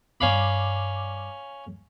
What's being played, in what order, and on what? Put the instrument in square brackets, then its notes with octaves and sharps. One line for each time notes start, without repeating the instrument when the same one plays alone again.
[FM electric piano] G2 D6 [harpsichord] C#4 F5 B5